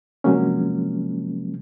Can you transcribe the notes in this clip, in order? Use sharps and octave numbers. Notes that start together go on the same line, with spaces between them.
C3 F3 F#3 G#3 A#3 C#4